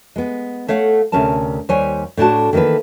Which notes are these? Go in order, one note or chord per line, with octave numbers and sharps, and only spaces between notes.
G#3 B3
A3 C#5 F5 F#5
D2 C3 C#4 A#4 A5
D#2 G3 C5 C#5 G#5
A2 D4 F#4 A5
D#3 E3 A#3 A4 B4